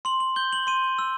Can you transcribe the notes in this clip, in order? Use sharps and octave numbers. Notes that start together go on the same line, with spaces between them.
C6 F#7
F#7
G6 G7
F#7
C6 D#7
E6